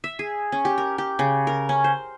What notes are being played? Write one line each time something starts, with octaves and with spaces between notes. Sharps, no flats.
E5
G#4
C#4
G4
A#4
G4
C#3
A#4
C#4
C5